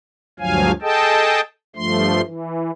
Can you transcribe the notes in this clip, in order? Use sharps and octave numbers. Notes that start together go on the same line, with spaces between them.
D2 G2 F3 F#3 F5 G#5
G#4 A4 D#5 G5 A5
G2 F3 A3 C6
E3